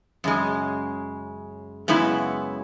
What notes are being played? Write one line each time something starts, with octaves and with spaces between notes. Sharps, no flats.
F#2 C#3 G#3
F#2 C#3 G#3 B3 E4